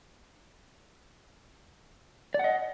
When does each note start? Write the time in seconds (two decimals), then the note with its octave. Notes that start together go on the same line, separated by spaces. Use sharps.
2.34 D5
2.39 F#5
2.44 D#5